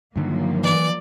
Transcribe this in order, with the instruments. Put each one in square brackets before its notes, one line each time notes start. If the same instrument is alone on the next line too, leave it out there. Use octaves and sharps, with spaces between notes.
[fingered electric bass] G2 D3 D#3 [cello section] F3 F#3 A#3
[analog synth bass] E3 [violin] D5